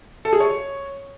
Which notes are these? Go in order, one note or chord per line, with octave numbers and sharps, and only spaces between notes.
A4
G#4
C#5